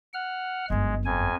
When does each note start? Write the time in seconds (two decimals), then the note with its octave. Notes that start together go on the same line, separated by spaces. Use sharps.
0.14 F#5 F6
0.70 G1 F#2 G#3
1.05 F2 G#5